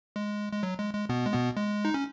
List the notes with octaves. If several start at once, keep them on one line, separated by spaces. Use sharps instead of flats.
G#3
G#3
F#3
G#3
G#3
B2 B3
G#3
B2 B3
G#3
D#4
C#4